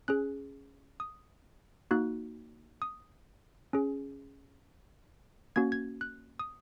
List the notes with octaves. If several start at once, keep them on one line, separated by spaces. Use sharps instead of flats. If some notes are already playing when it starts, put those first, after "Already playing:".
C#4 G#4 F#6
D#6
A#3 D#4 F#4 F#6
D#6
C#4 G#4
A#3 C#4 F#4 G#6
G#6
F#6
D#6